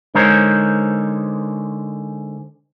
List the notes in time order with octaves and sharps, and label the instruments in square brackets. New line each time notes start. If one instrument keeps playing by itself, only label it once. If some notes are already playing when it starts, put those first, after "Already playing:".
[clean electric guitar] D3 G#3 D#4 A#4 C5 C#5